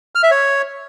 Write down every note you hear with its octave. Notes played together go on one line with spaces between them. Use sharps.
F6
E5
C#5